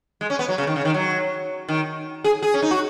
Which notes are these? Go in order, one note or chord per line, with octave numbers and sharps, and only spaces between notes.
G#3
C#4
B3
F#3
C#3
D#3
C#3
D#3
F#3
D#3
G#4
G#4
C#4
D#4
F#4